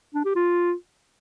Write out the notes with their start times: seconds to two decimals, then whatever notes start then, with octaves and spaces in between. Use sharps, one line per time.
0.14 D4
0.25 G4
0.35 F4